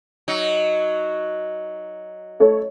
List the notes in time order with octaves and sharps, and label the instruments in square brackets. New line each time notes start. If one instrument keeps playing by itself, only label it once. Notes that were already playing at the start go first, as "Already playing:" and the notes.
[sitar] F#3 D#4
[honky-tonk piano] A3 A4 C#5